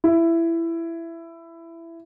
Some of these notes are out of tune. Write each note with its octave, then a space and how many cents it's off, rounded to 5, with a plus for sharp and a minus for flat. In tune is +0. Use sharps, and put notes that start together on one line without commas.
E4 +15